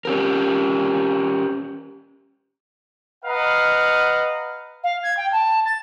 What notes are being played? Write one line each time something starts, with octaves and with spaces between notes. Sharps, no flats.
C#4 G4 A#4
B4 D#5 F5 F#5 A#5
F5
G#6
G5
A5
A6